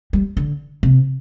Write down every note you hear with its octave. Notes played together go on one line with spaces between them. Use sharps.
G3
D3
C3